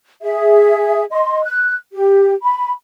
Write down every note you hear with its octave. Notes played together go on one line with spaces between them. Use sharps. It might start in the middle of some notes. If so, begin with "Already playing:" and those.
G#4 E5
D#5 C6
F#6
G4
B5